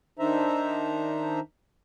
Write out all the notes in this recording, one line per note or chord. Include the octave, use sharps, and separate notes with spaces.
D#3 D4 D#4 C5 E5 A#5